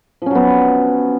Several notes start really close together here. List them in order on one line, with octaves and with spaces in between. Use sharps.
F3 C#4 F#3 B3